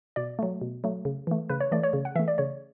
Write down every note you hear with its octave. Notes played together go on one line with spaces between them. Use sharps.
B2 D5
F#3 A3
B2
F#3 A3
C#3
E3 A3
C#3 B4
C#5
E3 A3 D5
C#5
C#3
F#5
E3 A3 E5
D5
C#3 C#5